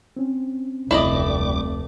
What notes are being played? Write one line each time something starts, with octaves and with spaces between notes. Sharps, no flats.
C4 C#4
F1 D2 G3 A3 E4 D5 D#5 D6